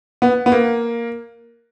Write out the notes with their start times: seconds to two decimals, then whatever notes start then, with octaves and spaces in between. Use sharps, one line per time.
0.22 B3
0.46 B3
0.52 A#3